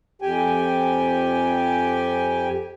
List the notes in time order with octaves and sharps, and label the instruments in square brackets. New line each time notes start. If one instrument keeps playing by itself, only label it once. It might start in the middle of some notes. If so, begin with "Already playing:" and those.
[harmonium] F2 G4 G5 G#5